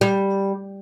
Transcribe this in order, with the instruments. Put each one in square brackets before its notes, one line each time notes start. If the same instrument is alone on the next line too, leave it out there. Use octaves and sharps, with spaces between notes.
[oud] G3